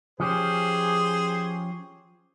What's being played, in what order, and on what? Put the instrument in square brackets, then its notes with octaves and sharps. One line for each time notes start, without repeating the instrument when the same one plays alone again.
[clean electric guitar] F3 C#4 G4 [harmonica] G#4 C5